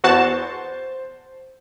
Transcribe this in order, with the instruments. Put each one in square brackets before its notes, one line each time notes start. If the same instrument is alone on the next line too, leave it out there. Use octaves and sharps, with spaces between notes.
[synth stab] E2 F#4 A5 [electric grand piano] C5